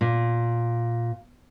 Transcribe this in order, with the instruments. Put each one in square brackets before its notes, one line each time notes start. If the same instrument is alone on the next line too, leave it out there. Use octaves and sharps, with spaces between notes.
[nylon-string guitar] A#2